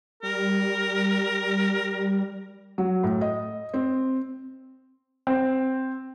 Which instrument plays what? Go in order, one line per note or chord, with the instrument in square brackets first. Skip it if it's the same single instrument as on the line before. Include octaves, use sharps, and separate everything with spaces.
[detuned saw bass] G3 [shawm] A#4
[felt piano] F#3
A2
D#5
C4
[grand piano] C4